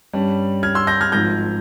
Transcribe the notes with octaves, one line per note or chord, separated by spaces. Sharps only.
G2 G3 C#4
F6 G#6
C6 E6
G6 A#6
F6 G#6
G#1 G#2 F3 G6 A#6